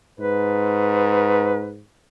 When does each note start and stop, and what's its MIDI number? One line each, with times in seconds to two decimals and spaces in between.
0.20 1.85 44
0.20 1.72 71